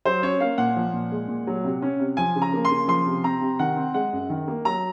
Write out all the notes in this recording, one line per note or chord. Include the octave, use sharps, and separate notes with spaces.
F#3 C5
C#4 C#5
A#3 F5
A#2 F#5
F3
A#2
G#3
A#2
F#3
C3
C#4
C3
F3 G#5
C#3
A#5
A#3
C6
C#3
F3 C6
C3
C4 A#5
C3
D#3 F#5
C4
G#3 F#5
F#2
D#3
A#3
F#3 A#5